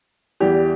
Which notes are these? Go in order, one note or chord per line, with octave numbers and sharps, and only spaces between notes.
E2 E3 G3 G4